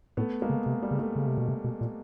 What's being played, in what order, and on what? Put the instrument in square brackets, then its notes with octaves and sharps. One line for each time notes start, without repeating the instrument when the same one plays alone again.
[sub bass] A2 [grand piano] A3 B3
[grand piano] G#3 A#3
[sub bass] C#3
C3
[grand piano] G3
[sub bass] C#3
[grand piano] G3 A3
[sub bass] C#3
C3
B2
C3
B2
A#2